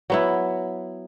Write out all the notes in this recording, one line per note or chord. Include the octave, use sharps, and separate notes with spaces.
F#3 B3 E4